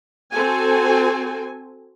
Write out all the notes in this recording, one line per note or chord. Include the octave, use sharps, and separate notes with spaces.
C4 F#4 A4 G#5